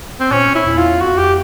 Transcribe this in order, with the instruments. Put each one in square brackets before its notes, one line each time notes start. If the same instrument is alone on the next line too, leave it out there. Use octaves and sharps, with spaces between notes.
[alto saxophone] C4
[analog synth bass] A#2 [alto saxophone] C#4
[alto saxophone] E4
[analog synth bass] E2
[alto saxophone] F4
[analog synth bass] F2 [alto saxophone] F#4
[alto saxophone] G4